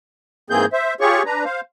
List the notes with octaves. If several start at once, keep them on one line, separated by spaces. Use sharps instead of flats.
G#2 E3 A#3 C4 G#4 G6
C5 E5
F4 G4 G#4 C#5 C#6
D4 B4 A#5
C5 F5